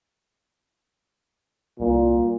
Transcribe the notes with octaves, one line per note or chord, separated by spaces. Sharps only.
C2 A#2